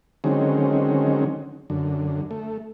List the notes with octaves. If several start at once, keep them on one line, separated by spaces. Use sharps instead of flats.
D3 D#3 F#3 G#3 C4 C#4
F#2 D3
A3